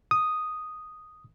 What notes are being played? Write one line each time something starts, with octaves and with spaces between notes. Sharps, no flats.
D#6